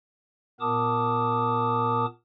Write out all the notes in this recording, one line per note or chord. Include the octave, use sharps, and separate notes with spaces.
A#2 B3 A#4 A5 D6 D#6